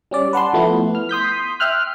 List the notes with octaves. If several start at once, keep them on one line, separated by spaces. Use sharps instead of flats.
G3 C#4 D5
B4 F#5 A5 C6
F3 A3 B3 E4
F6
C6 D#6 G6 B6
E5 G5 F6 F#6